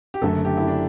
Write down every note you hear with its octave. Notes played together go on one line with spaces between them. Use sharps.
G4
F#1 F#2 D3 A3 A4
G4
E4
D4